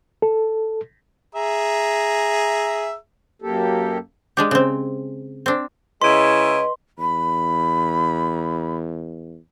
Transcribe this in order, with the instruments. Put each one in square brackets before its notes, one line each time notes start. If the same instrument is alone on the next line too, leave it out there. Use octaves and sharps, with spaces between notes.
[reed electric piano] A4
[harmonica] G#4 E5 A#5
[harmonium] F#2 A#3 G4 A4
[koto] G#3 D4 G4
C#3 C4
C4 D4
[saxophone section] C#3 G#3 E4 [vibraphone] B4 D#5 [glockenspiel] C6
[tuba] E2 [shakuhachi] B5